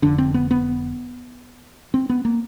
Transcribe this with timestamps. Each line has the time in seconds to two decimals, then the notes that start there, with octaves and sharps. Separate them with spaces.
0.02 F1 F2 D3 D4
0.18 C4
0.34 B3
0.51 B3
1.94 C4
2.09 B3
2.25 A#3